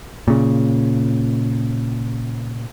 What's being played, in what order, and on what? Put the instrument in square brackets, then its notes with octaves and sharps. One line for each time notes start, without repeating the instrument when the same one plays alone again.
[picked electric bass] A#2 C#3